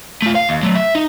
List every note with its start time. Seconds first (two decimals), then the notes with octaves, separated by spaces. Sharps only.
0.22 A3 F4
0.35 F5
0.49 D#2
0.63 F#3 A3
0.75 E5
0.95 D#4